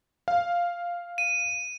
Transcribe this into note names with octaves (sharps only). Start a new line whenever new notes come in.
F5
D#7